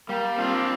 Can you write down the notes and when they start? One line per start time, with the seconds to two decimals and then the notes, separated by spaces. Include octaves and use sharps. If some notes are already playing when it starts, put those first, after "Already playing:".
0.09 G3 A#3
0.38 C4 D4 F4